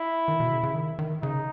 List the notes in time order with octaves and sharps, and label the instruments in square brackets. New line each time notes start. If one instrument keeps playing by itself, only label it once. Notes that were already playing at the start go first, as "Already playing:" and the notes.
Already playing: [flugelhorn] E4
[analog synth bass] D#3
B2
C#3
C#3
D#3
D#3
[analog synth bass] C#3 [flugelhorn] D#4